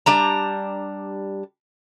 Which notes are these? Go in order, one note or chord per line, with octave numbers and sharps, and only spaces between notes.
G3 D4 A#5